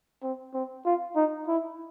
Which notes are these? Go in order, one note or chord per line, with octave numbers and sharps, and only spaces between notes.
C4
C4
F4
D#4
E4